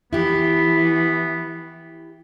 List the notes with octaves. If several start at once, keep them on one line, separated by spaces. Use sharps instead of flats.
E3 B3 E4 G4